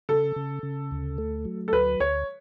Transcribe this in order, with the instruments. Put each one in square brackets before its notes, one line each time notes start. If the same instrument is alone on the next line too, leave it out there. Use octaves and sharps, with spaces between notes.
[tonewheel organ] C#3 [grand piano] A4
[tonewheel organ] C#3
C#3
D2
A3
F#3
[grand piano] A4
[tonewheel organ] D2 [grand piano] B4
[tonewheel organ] D2 [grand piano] C#5